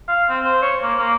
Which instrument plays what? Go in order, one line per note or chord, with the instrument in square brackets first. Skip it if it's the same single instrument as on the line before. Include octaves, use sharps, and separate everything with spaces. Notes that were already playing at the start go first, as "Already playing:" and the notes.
[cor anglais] F5
C4
C5
C#5
A#3
A#3